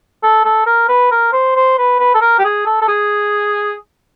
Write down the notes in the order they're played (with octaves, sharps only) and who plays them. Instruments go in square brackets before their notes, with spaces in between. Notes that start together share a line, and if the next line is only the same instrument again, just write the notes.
[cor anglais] A4
A4
A#4
B4
A#4
C5
C5
B4
B4
A4
A#4
G4
G#4
A4
A4
G#4